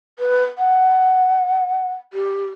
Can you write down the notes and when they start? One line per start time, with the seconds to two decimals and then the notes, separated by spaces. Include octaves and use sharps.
0.19 B4
0.58 F#5
2.13 G4